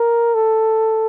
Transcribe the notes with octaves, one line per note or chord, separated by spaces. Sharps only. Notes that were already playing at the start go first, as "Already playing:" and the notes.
Already playing: A#4
A4